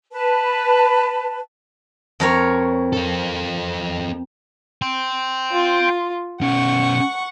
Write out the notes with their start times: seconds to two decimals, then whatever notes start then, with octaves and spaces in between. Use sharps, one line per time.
0.12 B4 A5
2.20 F2 A#4 C#5
2.93 C4 A4
4.82 G5 C6
5.52 F4
6.41 B2 C#4 F#5 C#6